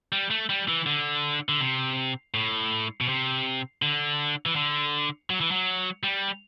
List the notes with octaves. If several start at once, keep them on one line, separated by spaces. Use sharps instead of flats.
G3
A3
G3
E3
D3
D3
C3
A2
B2
C3
D3
E3
D3
F#3
E3
F#3
G3